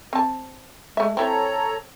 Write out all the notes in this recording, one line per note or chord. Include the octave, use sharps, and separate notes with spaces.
C4 A5
G#3 A3 E5
C4 E4 A4 C#5 A#5